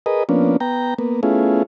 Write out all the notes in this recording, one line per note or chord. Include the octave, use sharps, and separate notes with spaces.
G#4 A#4 B4 D#5
F3 A#3 B3 C#4 D4
B3 G5 A#5
A#3 B3
A3 B3 C#4 E4 F4 G#4